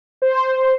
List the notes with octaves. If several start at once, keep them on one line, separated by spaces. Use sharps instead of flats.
C5